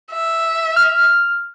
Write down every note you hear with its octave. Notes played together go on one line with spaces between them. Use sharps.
E5
F6